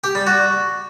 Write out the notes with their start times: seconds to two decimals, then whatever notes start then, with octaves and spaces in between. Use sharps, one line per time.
0.04 G4
0.15 G3
0.27 F#4